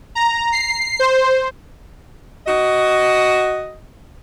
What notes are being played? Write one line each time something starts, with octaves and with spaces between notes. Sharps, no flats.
A#5
C7
C5
F#4 D#5